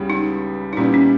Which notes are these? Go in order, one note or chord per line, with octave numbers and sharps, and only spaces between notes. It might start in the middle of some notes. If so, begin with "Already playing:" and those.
Already playing: C#2 C#3 G3 B3 E4
D#4
D#4
A#2 G3 B3 C#4 E4
C#4